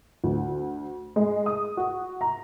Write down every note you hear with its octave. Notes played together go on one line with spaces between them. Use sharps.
D2
G#3
D#6
F#4
A#5